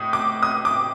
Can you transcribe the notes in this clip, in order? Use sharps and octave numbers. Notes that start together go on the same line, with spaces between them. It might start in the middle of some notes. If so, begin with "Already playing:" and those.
Already playing: A2 D#6
D6
D#6
D6